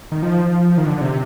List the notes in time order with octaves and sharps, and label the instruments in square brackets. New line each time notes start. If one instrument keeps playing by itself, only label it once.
[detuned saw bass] D#3
F3
D#3
D3
D3
C3